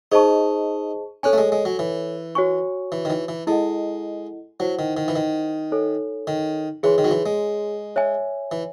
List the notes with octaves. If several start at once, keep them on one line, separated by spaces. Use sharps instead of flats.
D#4 G#4 C5 D#5 A5 C#6
C#4 A4 C#5 G#5
A3
G#3
G#3
F#3
E3
F#4 C#5 G#5 C#6
E3
D#3
E3
E3
G#3 E4 A4 D#5 F#5
F#3 E4 C5 F#5
D#3
D#3
E3
D#3
D#4 A4 C#5 G#5
D#3
E3 G#4 C#5 G#5 C6
D#3
F#3
E3
G#3
C#5 E5 G#5
E3